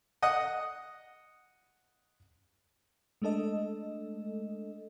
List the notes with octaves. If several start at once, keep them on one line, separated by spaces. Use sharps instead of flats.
D#5 F#5 D#6 F#6
G#3 A3 D4 A4 D#5